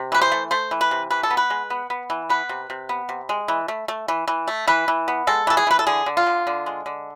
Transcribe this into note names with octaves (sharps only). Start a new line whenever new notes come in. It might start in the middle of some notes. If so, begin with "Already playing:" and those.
Already playing: C3
E3 B4
C5
A3
A3 C5
E3
B4
C3
E3 B4
A4
B3
B4
G#3
B3
B3
E3
B3 B4
C3
C3
B3
C3
G#3
E3
A3
A3
E3
E3
A3
E3 B4
E3
B3
G#3 A4
E3 A4
G#4
E3 B4
A4
D3 G#4
D3
F4
D3
D3
G#3
D3